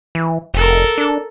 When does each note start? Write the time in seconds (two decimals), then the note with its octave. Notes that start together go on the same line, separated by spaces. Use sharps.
0.15 E3
0.54 F1 A4 A#4
0.98 D4